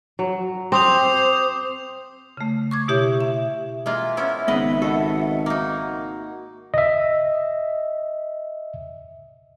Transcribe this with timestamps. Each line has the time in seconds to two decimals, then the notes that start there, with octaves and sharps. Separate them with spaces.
0.19 F#3
0.72 C4 C5 D6 D#6 F7
2.37 C#3 A3
2.71 C#6 D6 G#6
2.88 B2 E4 G4 C#5 E5
3.21 E5
3.86 G#3 A#3 F4 E5
4.17 B3 C#4 E4
4.48 G#1 C#3 B3 B4 D#5
4.82 F#4 A4 D#5 F#5
5.46 A#3 D#4
6.74 D#5 E5